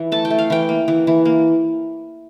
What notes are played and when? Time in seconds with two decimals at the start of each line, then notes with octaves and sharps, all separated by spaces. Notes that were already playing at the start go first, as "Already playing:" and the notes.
Already playing: E3
0.12 A3 A5
0.25 G5
0.30 A3
0.39 F5
0.50 E3 G5
0.69 A#3
0.88 E3
1.07 E3
1.25 A#3